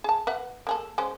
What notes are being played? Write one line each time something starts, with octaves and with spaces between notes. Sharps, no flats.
G#4 A5
B4 E5 F#5
A#3 G#4 A4
G#3 C#4 C5